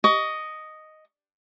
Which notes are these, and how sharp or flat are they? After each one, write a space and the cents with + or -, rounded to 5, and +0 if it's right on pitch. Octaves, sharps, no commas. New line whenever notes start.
D#5 +0 C#6 +30